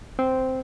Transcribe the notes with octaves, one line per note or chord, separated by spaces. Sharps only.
C4